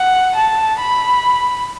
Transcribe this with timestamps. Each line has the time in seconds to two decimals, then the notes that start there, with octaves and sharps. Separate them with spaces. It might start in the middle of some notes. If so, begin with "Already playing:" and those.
Already playing: F#5
0.36 A5
0.80 B5